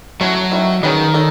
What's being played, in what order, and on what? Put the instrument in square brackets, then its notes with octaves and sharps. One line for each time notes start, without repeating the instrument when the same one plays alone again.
[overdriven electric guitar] F#3 [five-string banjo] A3 C#4 E4
[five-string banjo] D#3 A3 C#4 E4
[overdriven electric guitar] D#3 [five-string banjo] C#4 G#4 B4 D#5
[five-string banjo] D#4 A4 C#5